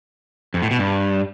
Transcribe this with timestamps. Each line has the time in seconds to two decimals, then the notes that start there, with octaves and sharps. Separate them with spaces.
0.54 F2
0.62 A2
0.71 B2
0.79 G2